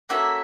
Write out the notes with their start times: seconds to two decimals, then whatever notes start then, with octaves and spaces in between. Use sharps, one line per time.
0.09 A#3 C#4 F#4 A4 E5 F#5